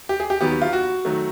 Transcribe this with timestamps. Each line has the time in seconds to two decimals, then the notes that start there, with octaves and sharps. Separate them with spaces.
0.09 G4
0.20 G#4
0.30 G4
0.41 D#2 D#3 F#3 B3 G4
0.62 F4
0.73 F#4
1.05 D#3 F#3 A3